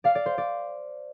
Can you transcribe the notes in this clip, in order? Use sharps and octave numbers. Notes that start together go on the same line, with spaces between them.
D5 F5
D5
C5
D5